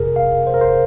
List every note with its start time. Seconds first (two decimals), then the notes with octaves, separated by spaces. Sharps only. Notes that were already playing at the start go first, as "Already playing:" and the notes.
Already playing: G1 F2 C3 G#4 A#4
0.16 F5
0.47 C5
0.54 A#4
0.61 C5